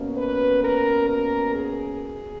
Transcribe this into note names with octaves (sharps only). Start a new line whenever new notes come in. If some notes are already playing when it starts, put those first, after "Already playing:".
Already playing: B2 A#3 C#4
B4
A#4
A#4
G#4